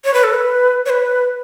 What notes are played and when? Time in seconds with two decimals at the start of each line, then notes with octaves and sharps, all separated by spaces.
0.05 C#5
0.14 B4
0.24 A4
0.34 B4
0.86 C#5
0.90 B4